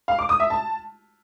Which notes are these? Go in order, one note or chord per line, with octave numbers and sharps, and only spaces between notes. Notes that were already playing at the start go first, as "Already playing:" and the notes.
F5
D6
D#6
E5
A5